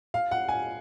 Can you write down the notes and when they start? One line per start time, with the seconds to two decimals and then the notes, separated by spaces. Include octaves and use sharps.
0.14 F5
0.31 F#5
0.49 G#5